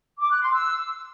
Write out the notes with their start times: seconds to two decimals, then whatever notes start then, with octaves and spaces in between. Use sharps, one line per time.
0.20 D6
0.31 F#6
0.42 C6
0.53 E6